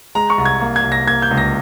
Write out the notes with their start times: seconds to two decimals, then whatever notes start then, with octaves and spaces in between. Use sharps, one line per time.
0.15 G#3 A#5
0.30 C#6
0.38 C2
0.45 G#6
0.61 A#3
0.76 G#6
0.84 C2
0.92 A#6
1.07 A#3 G#6
1.22 G6
1.31 C#2
1.37 A#6